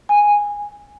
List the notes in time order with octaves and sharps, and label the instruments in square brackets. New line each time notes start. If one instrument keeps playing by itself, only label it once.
[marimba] G#5